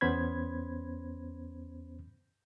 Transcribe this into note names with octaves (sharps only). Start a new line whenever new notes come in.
E2 B3 C#4 C5 B5 G#6